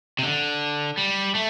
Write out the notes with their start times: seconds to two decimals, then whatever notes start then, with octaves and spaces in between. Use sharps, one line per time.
0.19 C3
0.23 D3
0.97 G3
1.35 A3